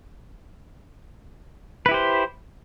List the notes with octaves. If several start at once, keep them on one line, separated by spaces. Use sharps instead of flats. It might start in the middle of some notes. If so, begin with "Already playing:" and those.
E4 G4 B4 C5